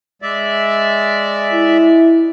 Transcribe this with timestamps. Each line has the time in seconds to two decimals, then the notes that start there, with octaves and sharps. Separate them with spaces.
0.22 G#3 D5 E5
1.52 E4